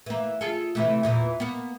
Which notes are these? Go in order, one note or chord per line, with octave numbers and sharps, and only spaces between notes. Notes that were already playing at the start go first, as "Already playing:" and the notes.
E3 A#3
F4 G#4 A4
C3 E3 A3
E2 A#2 E3
A#3 B3